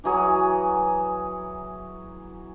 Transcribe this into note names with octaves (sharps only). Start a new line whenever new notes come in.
E3 F#3 G#4